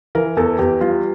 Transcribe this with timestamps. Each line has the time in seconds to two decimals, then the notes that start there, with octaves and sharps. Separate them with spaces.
0.15 E3 A#4
0.37 E2 A4
0.58 E2 G4
0.81 G3 F4